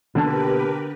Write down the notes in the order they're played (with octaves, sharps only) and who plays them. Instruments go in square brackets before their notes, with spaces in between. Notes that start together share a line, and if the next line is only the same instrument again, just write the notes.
[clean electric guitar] B2 A#3 A5 [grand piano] D3 [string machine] G4 A#4 B4